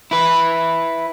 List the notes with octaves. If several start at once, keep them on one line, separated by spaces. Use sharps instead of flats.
E4 B4